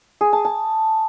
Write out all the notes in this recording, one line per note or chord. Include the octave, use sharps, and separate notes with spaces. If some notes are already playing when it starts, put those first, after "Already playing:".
G#4
A5
A5